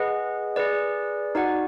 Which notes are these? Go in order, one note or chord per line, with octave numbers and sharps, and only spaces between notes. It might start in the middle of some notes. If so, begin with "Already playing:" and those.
Already playing: G#4 B4 D#5 F#5
G#4 B4 D5
D#4 F#4 D5 F#5